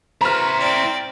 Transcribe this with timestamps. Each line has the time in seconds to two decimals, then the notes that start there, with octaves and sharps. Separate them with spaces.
0.21 E4 F#4 B4 C5 A#5 F6
0.59 C4 D5